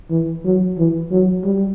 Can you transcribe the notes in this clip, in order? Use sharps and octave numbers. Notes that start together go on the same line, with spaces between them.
E3
F#3
E3
F#3
G3